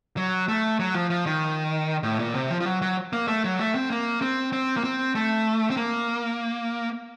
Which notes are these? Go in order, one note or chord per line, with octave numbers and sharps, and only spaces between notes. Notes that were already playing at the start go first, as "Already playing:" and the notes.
F#3
A3
F#3
F3
F3
D#3
A2
A#2
C3
F3
F3
F#3
F#3
A#3
A3
F#3
A3
C4
A#3
C4
C4
A#3
C4
A3
C4
A#3